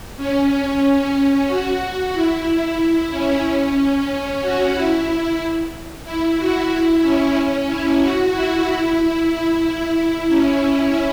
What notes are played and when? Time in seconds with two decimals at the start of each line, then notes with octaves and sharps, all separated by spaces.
0.17 C#4
0.82 C#4
1.48 F#4
2.13 E4
2.78 E4
3.11 C#4
4.41 F#4
4.73 E4
6.04 E4
6.37 F#4
6.70 E4
7.02 C#4
7.67 E4
8.00 F#4
8.32 E4
8.98 E4
9.31 E4
9.96 E4
10.28 C#4